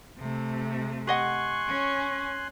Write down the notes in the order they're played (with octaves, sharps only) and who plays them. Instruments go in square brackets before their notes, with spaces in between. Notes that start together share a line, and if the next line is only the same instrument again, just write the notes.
[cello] C3 A3
[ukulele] G4 D#5 F#5 [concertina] G#5 C6 F#6 [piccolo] C#6
[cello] C#4